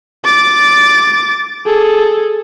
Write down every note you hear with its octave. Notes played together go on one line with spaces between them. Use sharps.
D6 A6
G#4 A4